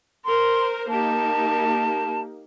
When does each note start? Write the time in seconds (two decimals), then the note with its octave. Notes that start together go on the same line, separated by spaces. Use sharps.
0.25 A#4 C5 C6
0.89 A#3 D#4 G4 A5